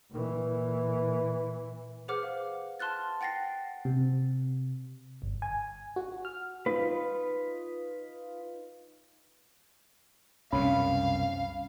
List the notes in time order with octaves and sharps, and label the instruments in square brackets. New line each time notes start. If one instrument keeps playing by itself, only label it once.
[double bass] A#2 E3
[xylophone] G#4 B4 C5 F#5 D6 F6
F5
A5 C6 F6 F#6 A6
F#5 G5 A6 A#6 C7
[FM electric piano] C3
G1
G#5
F#4
F6
[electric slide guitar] D#4 F4 B4
[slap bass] C2 F#2 B2 [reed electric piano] C#4 B5 [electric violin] F5